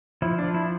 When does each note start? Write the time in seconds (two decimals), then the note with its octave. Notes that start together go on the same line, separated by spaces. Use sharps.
0.22 F3 E4
0.39 D4
0.44 F3
0.54 E4